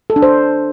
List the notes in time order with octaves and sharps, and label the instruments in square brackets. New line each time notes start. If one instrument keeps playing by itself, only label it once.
[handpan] A4
D4
C5